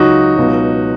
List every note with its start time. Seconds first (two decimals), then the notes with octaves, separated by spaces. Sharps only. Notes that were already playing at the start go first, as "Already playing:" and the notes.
Already playing: C#2 C#3 F#3 D#4 F#4
0.37 C#2 B2 F#3